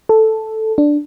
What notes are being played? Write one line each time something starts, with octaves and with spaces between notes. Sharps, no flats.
A4
D4